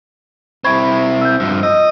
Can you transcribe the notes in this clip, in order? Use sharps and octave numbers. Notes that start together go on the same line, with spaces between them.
C4 E4 B5 C#6 G#6
E6 G6
G2 F3
D#5 E6